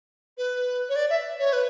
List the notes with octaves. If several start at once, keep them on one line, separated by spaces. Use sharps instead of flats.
B4
C#5
D5
E5
C#5
B4